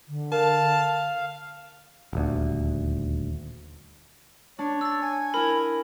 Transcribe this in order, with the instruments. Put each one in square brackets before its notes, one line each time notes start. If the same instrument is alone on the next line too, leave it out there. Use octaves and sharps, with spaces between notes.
[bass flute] D3
[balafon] A#4 [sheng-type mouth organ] F5 [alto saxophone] A5
[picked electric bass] D#1 D2
[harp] D4 [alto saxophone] C#5
[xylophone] E6 A6
[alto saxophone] G#5
[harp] E4 A#4 [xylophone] B5